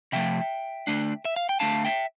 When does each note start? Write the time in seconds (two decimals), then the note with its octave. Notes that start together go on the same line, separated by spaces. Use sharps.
0.12 C3 F3 A3 E5 G5
0.87 D3 A3 D4
1.25 E5
1.36 F5
1.49 G5
1.60 D3 A3 D4 F5 A5
1.85 E5 G5